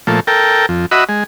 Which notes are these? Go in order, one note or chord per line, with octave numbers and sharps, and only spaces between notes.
A#2 F3 A3
A4 A#4 G5
F2
F#4 D#5 E5 B5
G#3